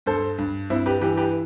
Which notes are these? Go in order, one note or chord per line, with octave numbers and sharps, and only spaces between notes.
G2 A4 C5
G2
G2 C4 E4
G4 B4
E3 G4 B4
G4 B4